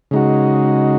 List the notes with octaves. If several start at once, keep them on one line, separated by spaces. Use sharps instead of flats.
C#3 G#3 D#4 F#4